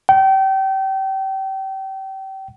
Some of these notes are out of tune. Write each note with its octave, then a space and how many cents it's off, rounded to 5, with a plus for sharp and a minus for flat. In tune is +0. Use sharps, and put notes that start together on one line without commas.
G5 -30